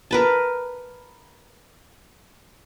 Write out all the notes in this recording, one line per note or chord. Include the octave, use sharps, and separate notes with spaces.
A#4 B4 A5